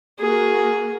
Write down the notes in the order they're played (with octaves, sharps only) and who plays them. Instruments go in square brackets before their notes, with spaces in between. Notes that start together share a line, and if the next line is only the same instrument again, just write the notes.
[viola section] A#3 F#4 A#4 [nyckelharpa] G#4